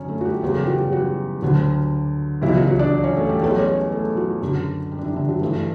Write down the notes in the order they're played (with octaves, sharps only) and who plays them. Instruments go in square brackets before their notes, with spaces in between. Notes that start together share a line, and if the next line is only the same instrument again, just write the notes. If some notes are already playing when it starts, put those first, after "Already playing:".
Already playing: [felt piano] F#2 D3 F#3 C#4 C#5
A3 A4
F#4
G3 G4
E2 C#3 F#3 G4
A4
G3 G4
F#3 F#4
F#3 F#4
D2 D3 F#3
C#2 B2 E3 F#3 E4
F#3 F#4
F#3 F#4
D4 D5
C#4 C#5
A3 A4
G3 G4
E2 B2 F#3 A3 A4
C#4 C#5
A3 A4
F#3 F#4
F#2 D3 F#3
G3 G4
D4
E3 E4
D3 D4
F#3 F#4
G2 E3 A3